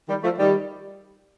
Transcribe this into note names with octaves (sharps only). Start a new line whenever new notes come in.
D#3 G3
F3 A3
D#3 G3